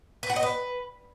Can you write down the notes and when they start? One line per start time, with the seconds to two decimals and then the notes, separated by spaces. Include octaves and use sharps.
0.23 B4
0.30 F#5
0.36 D#5
0.43 B4